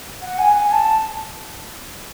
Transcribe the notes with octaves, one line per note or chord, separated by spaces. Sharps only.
F#5
G#5
G#5
G#5
A5